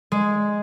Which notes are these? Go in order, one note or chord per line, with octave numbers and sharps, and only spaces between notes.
G#3